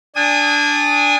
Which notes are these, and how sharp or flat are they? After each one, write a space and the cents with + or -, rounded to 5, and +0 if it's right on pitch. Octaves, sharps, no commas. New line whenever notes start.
D4 -5 G#5 -30 D#6 +15